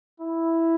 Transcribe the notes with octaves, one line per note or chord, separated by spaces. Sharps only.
E4